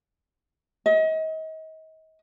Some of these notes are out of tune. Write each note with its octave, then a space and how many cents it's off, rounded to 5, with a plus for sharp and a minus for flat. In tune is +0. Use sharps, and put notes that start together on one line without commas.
D#5 +35